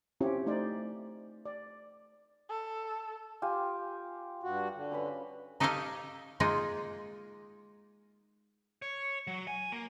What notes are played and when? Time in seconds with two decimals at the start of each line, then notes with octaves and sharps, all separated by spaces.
0.21 C4 C#4 E4 F4 G4 C#5
0.46 A3 D#4 C5 D5
1.45 D5
2.50 A4
3.42 F4 G4 G#5
4.43 G2 F#4
4.74 D3
4.92 C#4 B4 B5
5.60 D#4 G4 A4 C#5 D#5 F5
6.40 G#3 A#3 D#4 F4
8.82 C#5
9.27 F#3
9.48 G#5
9.72 A#3